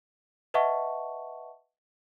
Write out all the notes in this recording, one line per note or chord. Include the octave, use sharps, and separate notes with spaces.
B4 D#5 E5 F#5 A5 C#6